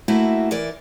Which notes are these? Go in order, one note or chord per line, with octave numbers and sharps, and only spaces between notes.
A3 A#3 E4 F#4 E5
E3 A#4 D5